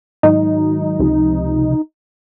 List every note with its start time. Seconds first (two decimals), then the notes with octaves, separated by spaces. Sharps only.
0.23 G#2 D#3 F#3 D#4
0.99 C#2 C3 F3